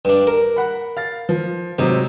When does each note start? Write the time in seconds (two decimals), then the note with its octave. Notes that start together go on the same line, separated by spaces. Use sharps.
0.05 G2 D4
0.27 A#4
0.56 F#5 B5
0.97 F5 A6
1.29 F3
1.79 G#2 C3 F#3 C4 D#4